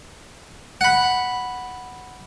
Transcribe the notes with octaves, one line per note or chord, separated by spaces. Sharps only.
F#5 B5